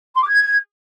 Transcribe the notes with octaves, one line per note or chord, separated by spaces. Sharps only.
C6
D6
G#6